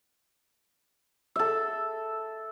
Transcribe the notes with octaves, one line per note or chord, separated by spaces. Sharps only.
A4 E5